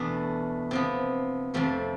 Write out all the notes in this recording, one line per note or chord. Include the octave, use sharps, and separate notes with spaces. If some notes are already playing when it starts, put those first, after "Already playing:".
Already playing: E2 B2 A3 D4
C3 F3 B3
F2 C3 F3 A3